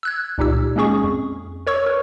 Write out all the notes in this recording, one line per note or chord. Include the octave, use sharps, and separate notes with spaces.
E6 F#6 G#6
C#2 A#2 D#4 G4 E6
G#3 A#3 C#4 G#4 C#6 D#6
F2
A#4 C#5 C#6 E6
A#4 B4